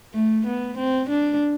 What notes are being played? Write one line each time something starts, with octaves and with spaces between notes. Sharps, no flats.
A3
B3
C4
D4